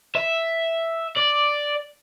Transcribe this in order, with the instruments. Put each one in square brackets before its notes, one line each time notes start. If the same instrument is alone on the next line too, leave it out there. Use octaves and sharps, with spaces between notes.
[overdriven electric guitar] E5
D5